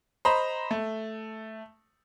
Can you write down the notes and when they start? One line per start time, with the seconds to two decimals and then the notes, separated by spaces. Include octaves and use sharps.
0.25 C5 D#5 A#5 B5
0.71 A3